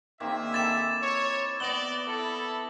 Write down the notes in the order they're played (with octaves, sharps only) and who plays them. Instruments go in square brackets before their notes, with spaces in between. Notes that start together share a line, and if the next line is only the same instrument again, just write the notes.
[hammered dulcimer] D#3 A#3 C4 [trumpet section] D4 G#4 E5
[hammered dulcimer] E4 A4 [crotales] D6 A6 E7
[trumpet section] C#5
[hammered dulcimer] B3 [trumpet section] D5 [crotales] A#6 F#7 G7
[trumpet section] E4 A4